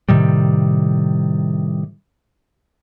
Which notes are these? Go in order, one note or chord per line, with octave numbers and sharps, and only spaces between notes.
A2 C3 D#3 G3